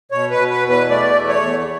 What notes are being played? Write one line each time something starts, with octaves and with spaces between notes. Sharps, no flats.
B2 C#5
B4
B2
B4
E2
B4
A3 D5
E2
C#5
E2